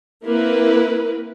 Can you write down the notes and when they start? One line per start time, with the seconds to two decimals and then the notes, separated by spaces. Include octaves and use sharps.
0.24 A#3 C4 E4 A#4 B4